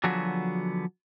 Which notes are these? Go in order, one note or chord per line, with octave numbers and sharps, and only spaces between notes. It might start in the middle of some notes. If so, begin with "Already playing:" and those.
D3 F3 F#3 B3 F#4 G#4